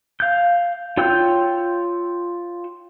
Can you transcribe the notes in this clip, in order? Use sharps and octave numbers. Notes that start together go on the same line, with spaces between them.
F5 G6
F4 C#5 G5 E6 G6